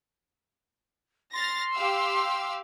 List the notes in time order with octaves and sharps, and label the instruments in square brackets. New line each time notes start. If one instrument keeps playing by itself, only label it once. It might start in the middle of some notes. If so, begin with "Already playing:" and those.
[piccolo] C6 [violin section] F6 A6 A#6
[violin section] G4 F5 E6